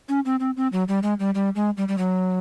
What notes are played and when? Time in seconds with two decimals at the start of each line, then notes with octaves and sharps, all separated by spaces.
0.09 C#4
0.25 C4
0.40 C4
0.57 C4
0.72 F#3
0.88 G3
1.03 G#3
1.19 G3
1.35 G3
1.55 G#3
1.77 G3
1.88 G3
1.98 F#3